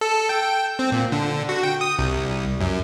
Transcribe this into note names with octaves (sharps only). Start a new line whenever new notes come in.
A4
G5
C4
A#2
D3
F#4
G5
D#6
C2
F#2